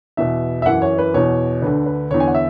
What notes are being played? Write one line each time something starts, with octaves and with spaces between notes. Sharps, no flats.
E2 B2 E5
E5
F#2 E3 F#5
C#5
B4
E2 B2 C#5
D2 D3 B4
B4
E2 D3 C#5
G#5
F#5
E5